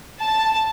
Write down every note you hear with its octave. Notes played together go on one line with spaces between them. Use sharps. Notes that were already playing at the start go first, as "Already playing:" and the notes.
A5